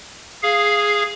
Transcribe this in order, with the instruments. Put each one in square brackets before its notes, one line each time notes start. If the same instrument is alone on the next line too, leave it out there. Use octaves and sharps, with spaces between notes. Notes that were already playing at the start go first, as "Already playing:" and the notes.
[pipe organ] G#4 F5